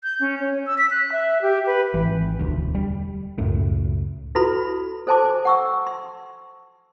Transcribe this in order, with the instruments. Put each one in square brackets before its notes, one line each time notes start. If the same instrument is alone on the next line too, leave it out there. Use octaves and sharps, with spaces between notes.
[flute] G6
C#4
C#5
E6
B6
F#6
E5
G4
B4
[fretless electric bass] G#1 E3
E1 D2
G3
C#2 F#2 A2
[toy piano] E4 F#4 A4 B4 B5 C6
A4 C5 G#5 A5 C6 D6
F#5 C#6 E6
C6